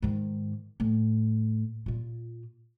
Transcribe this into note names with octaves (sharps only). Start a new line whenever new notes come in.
G#2 D#3
A2
A#2 F4